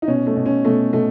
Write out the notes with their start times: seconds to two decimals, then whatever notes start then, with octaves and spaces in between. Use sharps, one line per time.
0.02 D#4
0.08 B2 C#4
0.27 A3
0.37 B2
0.46 C#4
0.65 B2 A3
0.93 B2 A3